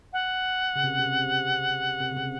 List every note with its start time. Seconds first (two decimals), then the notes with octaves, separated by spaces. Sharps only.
0.13 F#5
0.76 C#3
0.83 C3
0.98 C3
2.01 C3
2.11 C#3
2.17 C3